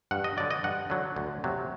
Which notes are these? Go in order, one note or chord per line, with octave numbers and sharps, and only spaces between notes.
G2 F#5
D#5
D3 F#3 D5
D#5
G2 F#5
D3 F#3
D2
C3 F#3